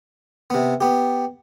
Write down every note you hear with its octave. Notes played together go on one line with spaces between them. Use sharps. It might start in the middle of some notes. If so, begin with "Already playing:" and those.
C3 B3
B3 G4